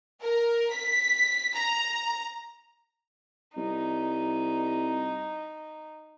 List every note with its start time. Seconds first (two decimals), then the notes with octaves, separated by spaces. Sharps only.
0.23 A#4
0.72 B6
1.55 A#5
3.57 C2 D#4